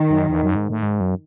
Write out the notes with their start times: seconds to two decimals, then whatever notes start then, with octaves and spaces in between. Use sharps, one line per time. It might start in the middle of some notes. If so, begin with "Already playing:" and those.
Already playing: D#3
0.10 F#2
0.29 E2
0.43 F#2
0.56 G#2
0.70 A2
0.82 G#2
1.00 F#2